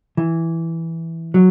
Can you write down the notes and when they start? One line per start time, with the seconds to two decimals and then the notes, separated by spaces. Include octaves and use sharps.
0.17 E3
1.34 F#3